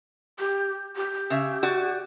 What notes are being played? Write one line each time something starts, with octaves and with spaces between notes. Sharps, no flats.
G4
G4
C#3 E5
F#4 D5